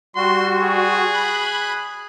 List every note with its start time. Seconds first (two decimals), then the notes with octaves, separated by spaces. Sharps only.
0.16 G3 F#4 C6
0.62 G#4
1.13 B5 F#6